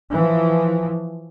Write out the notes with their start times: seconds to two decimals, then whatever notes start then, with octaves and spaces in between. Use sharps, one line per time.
0.13 E3 F3